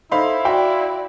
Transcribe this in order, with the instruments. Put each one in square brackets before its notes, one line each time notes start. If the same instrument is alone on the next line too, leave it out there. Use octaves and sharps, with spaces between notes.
[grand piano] D#4 A4 C5 [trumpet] E4 [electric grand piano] F5 B5 C6
[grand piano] F#4 G5 [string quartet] D5